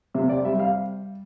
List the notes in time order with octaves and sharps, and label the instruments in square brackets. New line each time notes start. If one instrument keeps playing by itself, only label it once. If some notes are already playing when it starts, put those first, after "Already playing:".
[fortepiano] C3 E5
D5
G3 E5
F5